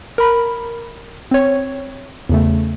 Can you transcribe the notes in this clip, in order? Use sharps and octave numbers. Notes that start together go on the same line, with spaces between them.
A#4 B5
C4 C#5
E2 C#3 A3